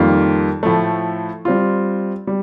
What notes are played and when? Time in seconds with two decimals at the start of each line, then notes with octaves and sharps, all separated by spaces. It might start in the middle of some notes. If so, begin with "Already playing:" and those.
Already playing: F2 D#3 G3 A#3 F4
0.63 A2 F3 A3
1.45 G3 C4 F4
2.27 G3